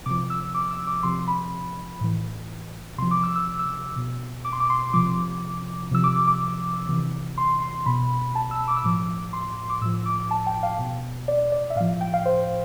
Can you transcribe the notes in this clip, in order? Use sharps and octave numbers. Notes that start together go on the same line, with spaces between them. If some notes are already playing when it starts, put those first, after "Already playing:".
C3 F3 D6
E6
D6
E6
D6
C3 F3 C6
B5
A2 E3
C3 F3 C6
D6
E6
E6
E6
B2
D6
C6
D6
C6
C3 F3 D6
C3 F3 E6
D6
D6
D6
C3 E3
C6
C6
B2 B5
A5
E6
D6
E6
A2 F3 D6
C6
D6
A2 F3 E6
D6
A5
G5
F5
B2
D5
D5
E5
A2 F3 F5
G5
F5
C5